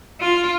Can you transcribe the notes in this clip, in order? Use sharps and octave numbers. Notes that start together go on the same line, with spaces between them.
F4